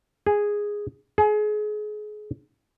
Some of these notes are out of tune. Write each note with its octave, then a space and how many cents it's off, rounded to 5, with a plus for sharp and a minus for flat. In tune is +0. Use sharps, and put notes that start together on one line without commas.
G#4 -5
G#4 +30